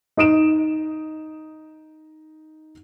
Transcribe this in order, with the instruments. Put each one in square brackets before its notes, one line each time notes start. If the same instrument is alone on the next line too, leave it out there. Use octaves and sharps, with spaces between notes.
[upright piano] D#4 D#6 D7 E7